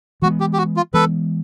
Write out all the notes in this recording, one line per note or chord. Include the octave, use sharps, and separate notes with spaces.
E3 G#3 B3 F#4
G4
G4
F#4
F4
E3 G#3 B3 A4 B4